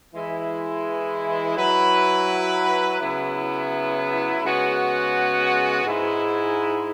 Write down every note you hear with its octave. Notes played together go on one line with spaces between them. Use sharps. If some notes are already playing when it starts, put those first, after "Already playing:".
E3 G#3 E4
F#3 E4 B4
C#3 F#3 B3 E4
C#3 G#3 B3 F#4 C#5
G#2 G#3 E4